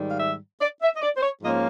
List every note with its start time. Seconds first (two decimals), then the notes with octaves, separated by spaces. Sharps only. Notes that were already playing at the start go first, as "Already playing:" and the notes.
Already playing: G#2 D#3 G3
0.09 F5
0.20 E5
0.61 D5
0.82 E5
0.96 D#5
1.02 D5
1.16 C5
1.22 C#5
1.43 G#2 F3 A#3 C#4 F4 D#5